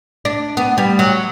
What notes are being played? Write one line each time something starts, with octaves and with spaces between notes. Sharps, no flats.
D4
B3
G3
F#3